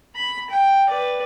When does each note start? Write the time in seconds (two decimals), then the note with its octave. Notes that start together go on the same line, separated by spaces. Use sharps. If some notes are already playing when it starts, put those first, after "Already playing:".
0.15 B5
0.50 G5
0.89 B4 D5